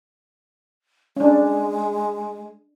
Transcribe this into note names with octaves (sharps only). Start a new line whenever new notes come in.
G#3 C#4 D4